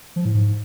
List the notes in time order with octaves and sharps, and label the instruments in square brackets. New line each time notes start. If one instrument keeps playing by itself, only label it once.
[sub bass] F3
A2
G#2